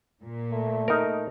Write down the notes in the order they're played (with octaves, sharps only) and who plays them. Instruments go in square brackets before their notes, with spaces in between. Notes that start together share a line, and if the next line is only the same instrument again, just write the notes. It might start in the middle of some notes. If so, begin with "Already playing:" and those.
[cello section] A#2
[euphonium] A3
[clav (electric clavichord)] D#4 A#4